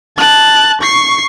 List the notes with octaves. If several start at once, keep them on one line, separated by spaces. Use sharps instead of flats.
A5 F#6
C#6 C7